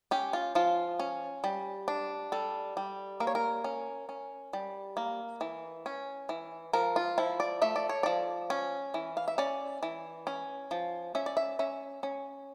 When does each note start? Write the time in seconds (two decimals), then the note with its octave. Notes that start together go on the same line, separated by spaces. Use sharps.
0.11 C#4 G4
0.33 F4
0.55 F3 F4
0.99 C#4
1.44 G3
1.88 D4
2.32 G3 A4
2.77 G3
3.20 A#3 A#4
3.27 C#5
3.35 A#4
3.64 C#4
4.09 C#4
4.53 G3
4.97 A#3
5.41 E3
5.86 C#4
6.29 E3
6.73 F3 A#4
6.96 F4
7.18 F3 E4
7.40 D5
7.62 A3 E5
7.76 D5
7.89 C#5
8.03 F3 D5
8.50 C#4
8.94 E3
9.17 F5
9.28 E5
9.38 C#4 D5
9.83 E3
10.27 C#4
10.71 F3
11.15 C#4 E5
11.26 D5
11.37 E5
11.59 C#4 E5
12.03 C#4